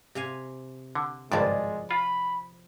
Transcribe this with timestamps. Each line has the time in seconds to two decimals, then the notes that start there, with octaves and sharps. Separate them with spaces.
0.15 C3 F5 G#5
0.95 D3
1.32 G#1 C#2 G2 F3 G#3 D5
1.91 F4 B5